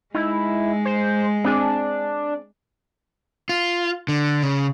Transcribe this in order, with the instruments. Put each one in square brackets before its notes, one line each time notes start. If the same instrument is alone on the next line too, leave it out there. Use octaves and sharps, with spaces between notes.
[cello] G#3 [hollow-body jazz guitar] D#4 [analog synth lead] E4
[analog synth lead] C5
[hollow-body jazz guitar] C4 G#4 [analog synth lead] D4
[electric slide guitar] F4
D3
C#3